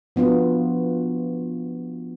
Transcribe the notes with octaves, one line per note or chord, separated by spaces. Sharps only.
F3 B3 D4 F4 F#4